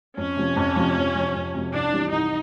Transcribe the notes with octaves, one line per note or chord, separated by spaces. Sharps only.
F2 C#4
C3 F3
F2
C3 F3
F2
C3 F3
F2
C3 F3
C2 D4
C3 E3 G3
C2 D#4